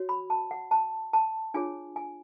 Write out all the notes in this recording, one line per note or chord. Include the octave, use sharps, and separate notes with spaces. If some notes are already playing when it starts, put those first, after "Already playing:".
Already playing: F#4 C#5
B5
A5
F#5
A5
A5
D4 F4 G#4 C#5 G#5
G#5